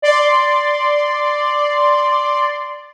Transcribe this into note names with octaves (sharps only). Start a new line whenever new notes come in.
D5 C6